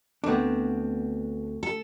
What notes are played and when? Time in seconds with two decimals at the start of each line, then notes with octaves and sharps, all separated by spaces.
0.24 D2 B3 C4 D4
1.63 A4